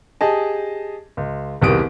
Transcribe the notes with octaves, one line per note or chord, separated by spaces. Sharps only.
G4 G#4 D#5 A5
C#2
E1 C2 D#3 G4 D#6 D7